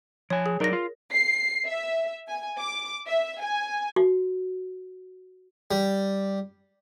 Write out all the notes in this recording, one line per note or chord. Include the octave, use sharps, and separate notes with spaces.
F3 C#5 G#5
G#4
F#3 D#4 A#4 D5 A#6
F4
C7
E5
G#5
D6
E5
G#5
F#4
G3